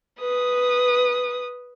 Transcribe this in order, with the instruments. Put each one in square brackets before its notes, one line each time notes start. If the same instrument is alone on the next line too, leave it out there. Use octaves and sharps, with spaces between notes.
[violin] B4 D#6